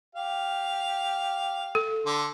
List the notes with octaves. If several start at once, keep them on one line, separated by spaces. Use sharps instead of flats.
G4 F5
A4
D3 C6